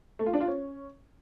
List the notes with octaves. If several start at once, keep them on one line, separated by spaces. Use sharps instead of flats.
A3
F4
D4
F4
C#4